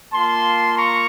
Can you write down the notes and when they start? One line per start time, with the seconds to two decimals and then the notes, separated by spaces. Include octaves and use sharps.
0.12 A#3 F4 A5 C6
0.77 A#5 C#6